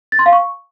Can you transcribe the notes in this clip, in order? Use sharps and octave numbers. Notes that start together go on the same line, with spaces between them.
A6
C6
F5
C#6